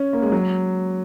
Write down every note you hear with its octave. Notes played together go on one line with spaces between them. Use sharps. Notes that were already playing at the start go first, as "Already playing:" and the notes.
Already playing: C#4
A#3
G#3
F#3